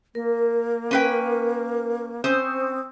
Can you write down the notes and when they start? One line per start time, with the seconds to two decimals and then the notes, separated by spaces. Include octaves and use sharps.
0.15 A#3 A#4
0.91 C#4 B4 G5
2.24 C4 C#4 C5 D#6 E6